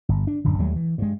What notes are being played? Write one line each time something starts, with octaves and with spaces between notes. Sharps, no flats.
G1
D4
D1 G1 F#2 D3
D#2 F#3 G3 A3
E3
G2 G#3